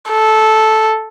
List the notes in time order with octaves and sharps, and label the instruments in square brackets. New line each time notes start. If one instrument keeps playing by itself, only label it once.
[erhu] A4